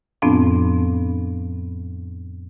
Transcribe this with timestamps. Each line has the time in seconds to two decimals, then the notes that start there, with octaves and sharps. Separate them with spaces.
0.22 F2 A2 F3 B3 C4 D4